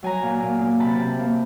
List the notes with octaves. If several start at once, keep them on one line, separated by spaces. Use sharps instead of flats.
F#3 G#5 A#5
A#2
A#2
A#3
C3 A5 B5
C3
A#3